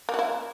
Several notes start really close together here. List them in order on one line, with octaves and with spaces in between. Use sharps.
A#3 F#4 E4